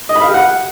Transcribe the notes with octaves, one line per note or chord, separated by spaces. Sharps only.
D#5
B5
F5
G4
F#5